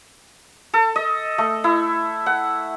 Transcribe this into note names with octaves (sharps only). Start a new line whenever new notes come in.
A4
D#5
A3
E4
F#5